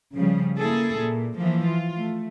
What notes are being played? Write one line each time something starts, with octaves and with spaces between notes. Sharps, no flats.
C#3 F3 G3
A#3 E4 G#4 A4
A#2
E3 F3 A#3
F4
A3